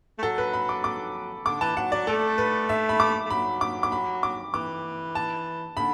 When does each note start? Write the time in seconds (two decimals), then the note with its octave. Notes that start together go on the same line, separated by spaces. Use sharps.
0.18 A3
0.23 F#3 A4
0.38 B4
0.53 B5
0.69 D6
0.84 D6
1.46 D3 D6
1.61 E3 A5
1.77 F#3 F#5
1.92 F#3 D5
2.07 A3 A4
2.38 B4
2.69 E5
2.89 B5
3.00 D6
3.26 A3
3.30 F#3 B5
3.61 D6
3.83 D6
3.92 B5
4.23 D6
4.54 E3 D6
5.15 A5
5.77 D3 B5